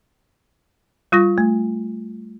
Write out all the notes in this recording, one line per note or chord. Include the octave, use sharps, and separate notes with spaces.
G3 F4 C#6 A#6
A3